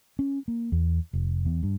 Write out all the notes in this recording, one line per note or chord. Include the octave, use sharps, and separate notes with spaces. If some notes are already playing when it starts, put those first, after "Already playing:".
C#4
A#3
E2
F1
E2
G2